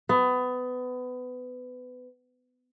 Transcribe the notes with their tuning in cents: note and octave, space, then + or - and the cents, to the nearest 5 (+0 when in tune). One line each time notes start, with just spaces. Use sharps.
B3 +25